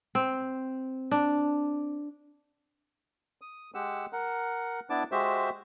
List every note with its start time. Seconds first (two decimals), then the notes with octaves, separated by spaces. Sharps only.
0.15 C4
1.11 D4
3.41 D#6
3.74 G#3 G4 F#5 E6
4.13 A#4 F#5
4.90 B3 D4 E4 A5 D6
5.12 G#3 F#4 G4 C5 E5